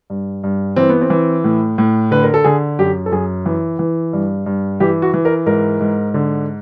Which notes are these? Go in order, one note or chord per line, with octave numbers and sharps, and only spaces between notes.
G2
G2
E3 C4
B3
C4
E3
A2
A2
D3 B4
A#4
A4
D3 G#4
F#2 G4
A4
F#2 G#4
E3
E3
G2
G2
E3 G4
F#4
E3
A#4
G#2 A#4
G#2
D3